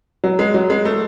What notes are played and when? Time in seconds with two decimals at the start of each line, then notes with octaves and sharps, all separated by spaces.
0.24 F#3
0.39 G#3
0.54 F#3
0.70 G#3
0.85 A3